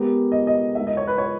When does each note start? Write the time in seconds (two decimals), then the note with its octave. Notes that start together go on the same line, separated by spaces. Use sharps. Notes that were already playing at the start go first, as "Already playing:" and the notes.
Already playing: G#3 B3 G4 A#4
0.32 D#5
0.47 D#5
0.75 G#3 D#4 A#4 E5
0.87 D#5
0.97 C#5
1.07 B4
1.18 C#5